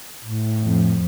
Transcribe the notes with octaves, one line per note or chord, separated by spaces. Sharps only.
A2
F2